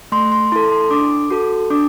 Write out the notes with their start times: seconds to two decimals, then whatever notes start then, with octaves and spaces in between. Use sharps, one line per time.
0.12 A3 C6
0.32 C6
0.52 E4 A4 C6
0.72 C6
0.91 D4 D6
1.30 F#4 A4
1.70 D4 D6